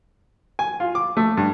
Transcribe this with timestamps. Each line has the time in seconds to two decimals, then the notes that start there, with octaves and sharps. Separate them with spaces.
0.59 G#5
0.80 F4
0.95 D6
1.17 A3
1.37 G2